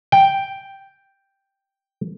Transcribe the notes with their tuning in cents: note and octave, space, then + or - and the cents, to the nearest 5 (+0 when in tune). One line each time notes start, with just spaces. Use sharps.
G5 +0